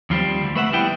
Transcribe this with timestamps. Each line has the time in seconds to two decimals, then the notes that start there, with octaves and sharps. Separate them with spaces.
0.10 D#2 F3 G3 C4
0.43 D2
0.55 A3 B4 E5 F#5
0.72 G3 B3 E4 G5